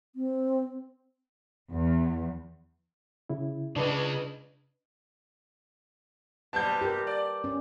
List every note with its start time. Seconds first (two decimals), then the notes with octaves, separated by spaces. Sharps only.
0.16 C4
1.71 E2
3.29 C#3 E4
3.76 C#3 G#3 D4 B4 D#5
6.53 C3 G3 B3 A5 G6
6.81 G4 A#4
7.07 D5
7.44 C#4